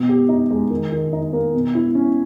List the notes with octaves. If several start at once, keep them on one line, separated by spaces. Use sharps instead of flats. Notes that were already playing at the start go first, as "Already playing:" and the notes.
Already playing: B2
G4
D#4
G#3
D#3
D#3
D#4
A#3
B2
E4
C#4